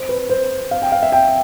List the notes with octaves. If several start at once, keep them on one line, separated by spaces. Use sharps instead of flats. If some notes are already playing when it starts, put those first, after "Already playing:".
Already playing: C5
B4
C5
F5
G5
F5
E5
G5